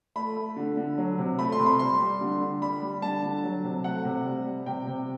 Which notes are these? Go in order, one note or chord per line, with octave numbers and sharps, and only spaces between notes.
A3 B5
A3
D3
D3
F#3
C3
A3 B5
C6
C3
B5
G3 C6
G3
D3
D3
G3 B5
G3
D3 A5
D3
F#3
C3
A3 F#5
C3
G3
G3
C3 G5
C3